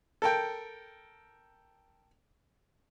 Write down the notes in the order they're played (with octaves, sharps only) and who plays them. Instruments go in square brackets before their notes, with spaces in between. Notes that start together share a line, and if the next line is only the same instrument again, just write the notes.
[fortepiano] A4 A#4 G5